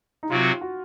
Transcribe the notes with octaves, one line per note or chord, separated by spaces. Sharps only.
D#4
C3 F#3 C4 F4 F#4
F#4